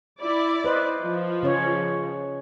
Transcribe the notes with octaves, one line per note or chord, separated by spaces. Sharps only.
E4 D5
B4 C5 D#5
F3
C#3 C#4 C#5